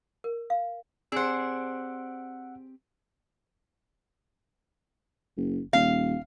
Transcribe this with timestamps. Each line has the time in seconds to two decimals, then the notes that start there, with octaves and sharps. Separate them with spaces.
0.24 A#4
0.50 F5
1.12 C4 G4 G#4 C5 D5 F#5 E6
5.37 F#1
5.73 D#1 F5